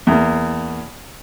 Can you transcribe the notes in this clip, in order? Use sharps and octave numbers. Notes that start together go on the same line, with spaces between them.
E2 A#3